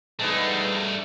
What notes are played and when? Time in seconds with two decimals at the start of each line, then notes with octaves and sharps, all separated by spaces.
0.19 G2 G#3 A3 B3 D#4